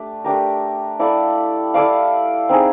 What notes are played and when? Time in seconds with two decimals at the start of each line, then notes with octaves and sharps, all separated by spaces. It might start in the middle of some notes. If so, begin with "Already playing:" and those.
Already playing: A3 D4 G4
0.24 A3 D4 G4 A#4
0.99 E4 A4 D5 F5
1.74 E4 A4 D5 F5
2.49 C4 D#4 G#4